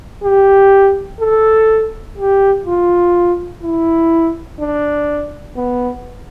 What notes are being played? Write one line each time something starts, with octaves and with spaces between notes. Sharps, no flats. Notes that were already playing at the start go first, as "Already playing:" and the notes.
G4
A4
G4
F4
E4
D4
B3